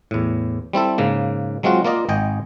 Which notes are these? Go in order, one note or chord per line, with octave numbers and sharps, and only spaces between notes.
E2 A2
G3 C4 E4 A4
G#2 C#3 A#3
F#3 G#3 C4 F4 F#4
A#3 F4 A#4 D5 D#5
G#1 D#5 G5 G#5